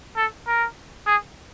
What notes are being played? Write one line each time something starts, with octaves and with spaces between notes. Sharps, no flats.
A4
A#4
G#4